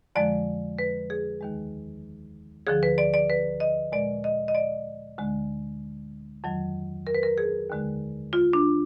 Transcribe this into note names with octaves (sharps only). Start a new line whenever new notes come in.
F2 D3 F3 G#3 D5
B4
G#4
D#2 D#3 G#3
D2 D3 F3 G#4
B4
D5
D5
B4
D#5
A#2 G#3 D5
D#5
D#5
D5
D2 D3 G#3
F2 D#3 F#3
A#4
B4
A#4
G#4
D#2 D3 G#3
F4
D4